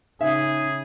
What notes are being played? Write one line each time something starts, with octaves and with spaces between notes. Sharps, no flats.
C#3 D#4 G#4 E5